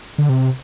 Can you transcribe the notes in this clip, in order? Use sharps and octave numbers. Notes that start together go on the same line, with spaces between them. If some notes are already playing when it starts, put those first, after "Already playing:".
D3
C3